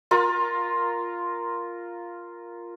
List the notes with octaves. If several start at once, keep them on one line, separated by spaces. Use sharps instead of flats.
F4 A#4